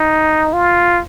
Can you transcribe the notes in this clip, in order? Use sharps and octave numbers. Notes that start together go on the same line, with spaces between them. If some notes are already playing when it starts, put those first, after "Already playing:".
Already playing: D#4
F4